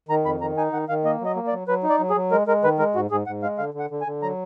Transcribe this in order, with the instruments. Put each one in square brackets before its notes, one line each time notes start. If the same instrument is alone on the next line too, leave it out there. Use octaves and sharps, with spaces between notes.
[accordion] D#3 A#5
F2 B5
D#3 A#5
D#4 G#5
D#3 F#5
D#3 F5
A#3 D#5
F#3 D#5
A#3
D5
F#3
F#3 B4
D#4
D5
F#3
G#4
F#3
G#3 A#4
G#3 A#4
D#3 B4
G#3 A#4
G#2 F#4
G#2 G#4
G#2 F#5
G#3 F5
D3 F5
D3
F#5
D3
G#5
D3
F#3 A#5